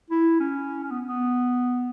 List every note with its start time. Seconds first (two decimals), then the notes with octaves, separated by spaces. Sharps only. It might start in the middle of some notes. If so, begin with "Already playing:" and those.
0.10 E4
0.40 C#4
0.83 C#4
0.91 B3
1.06 B3